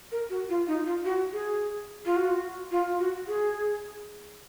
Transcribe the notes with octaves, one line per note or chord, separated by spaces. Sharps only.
A#4
F#4
F4
D#4
F4
F#4
G#4
F4
F#4
F4
F#4
G#4